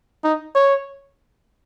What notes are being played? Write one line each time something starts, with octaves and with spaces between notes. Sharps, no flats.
D#4
C#5